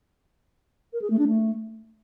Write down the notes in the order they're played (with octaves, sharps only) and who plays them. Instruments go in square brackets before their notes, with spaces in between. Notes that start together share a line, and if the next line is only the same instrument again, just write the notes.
[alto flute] A#4
G#4
A3
D4
A3